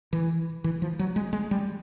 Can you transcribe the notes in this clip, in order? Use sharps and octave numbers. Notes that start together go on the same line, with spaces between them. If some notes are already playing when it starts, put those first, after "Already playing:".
E3
E3
F3
F#3
G#3
G#3
G3